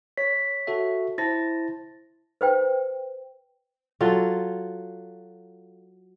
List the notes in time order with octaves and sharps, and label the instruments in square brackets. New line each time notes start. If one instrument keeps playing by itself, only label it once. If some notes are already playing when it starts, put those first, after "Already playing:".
[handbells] C#5 B6
[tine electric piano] F#4 A4 E5
[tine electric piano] E4 C5 A5 [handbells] A6 A#6
[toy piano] B4 C5 G5
[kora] F#3 F4 A4